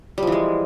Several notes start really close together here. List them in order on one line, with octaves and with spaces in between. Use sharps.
G3 F3 E3 G#3